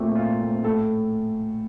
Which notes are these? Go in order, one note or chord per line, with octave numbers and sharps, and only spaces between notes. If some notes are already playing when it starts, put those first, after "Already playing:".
Already playing: A#2 A3 C4
A#2 F4
A3 C4
A2 A4